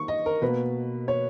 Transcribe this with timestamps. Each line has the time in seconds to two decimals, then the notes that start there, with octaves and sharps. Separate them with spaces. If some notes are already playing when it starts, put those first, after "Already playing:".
Already playing: D#3 A#3 C#6
0.08 D#5
0.26 A#4
0.42 B2 A#3 B4
1.08 C#5